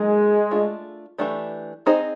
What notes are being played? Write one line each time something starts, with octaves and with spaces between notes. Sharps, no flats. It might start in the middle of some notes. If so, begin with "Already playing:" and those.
Already playing: F#3 G#3 A#3 D#4 G#4
A3 D4 F4
E3 A3 D4 G4
C4 D#4 G#4 C5 D#5